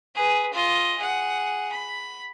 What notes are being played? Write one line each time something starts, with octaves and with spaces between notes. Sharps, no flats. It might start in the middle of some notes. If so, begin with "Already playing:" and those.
G#4 B4
F4 D#5
G#4 F#5
B5